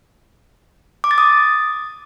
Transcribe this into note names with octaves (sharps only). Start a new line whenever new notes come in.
D6
A6
D#6